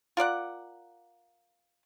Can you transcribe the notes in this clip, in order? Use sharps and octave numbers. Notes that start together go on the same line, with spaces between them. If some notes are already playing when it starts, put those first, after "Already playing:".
F4 A#4 D5 F#5